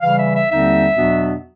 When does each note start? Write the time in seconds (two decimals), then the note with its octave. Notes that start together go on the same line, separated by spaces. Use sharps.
0.02 C#3 E3 G3 F5
0.18 E5
0.34 E5
0.49 D#2 D3 G3 C4 D#4 E5
0.97 E2 B2 F#3 B3 D4